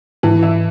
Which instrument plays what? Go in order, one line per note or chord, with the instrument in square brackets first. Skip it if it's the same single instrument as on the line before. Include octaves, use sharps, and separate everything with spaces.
[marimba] G#2 [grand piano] E3
[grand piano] E4